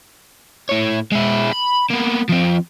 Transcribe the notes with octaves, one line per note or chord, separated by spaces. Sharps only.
A2 C#5
G#3 E4
B5
A#3 B3
F3 C4